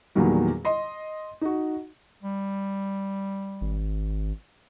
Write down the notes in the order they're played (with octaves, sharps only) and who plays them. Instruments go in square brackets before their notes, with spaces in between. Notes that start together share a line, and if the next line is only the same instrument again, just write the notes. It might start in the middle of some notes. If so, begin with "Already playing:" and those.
[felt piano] E2 A#2 D#3 F#3 G3
D#5 C6
D#4 F#4
[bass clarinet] G3
[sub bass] G#1